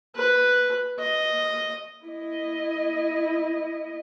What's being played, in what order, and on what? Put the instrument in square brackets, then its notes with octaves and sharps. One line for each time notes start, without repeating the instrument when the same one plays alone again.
[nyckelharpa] B4
D#5
[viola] E4 D#5